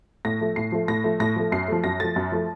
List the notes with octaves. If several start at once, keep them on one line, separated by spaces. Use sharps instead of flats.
A2 A#6
F3 A3
A2 C7
F3 A3
A2 A#6
F3 A3
A2 A#6
F3 A3
F#2 C7
F3 A3
F#2 A#6
F3 A3 A6
F#2
F3 A3